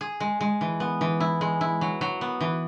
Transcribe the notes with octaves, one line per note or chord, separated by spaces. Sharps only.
G#4
G#3
G#3
E3
B3
E3
E4
G#3
E4
F#3
F#3
B3
E3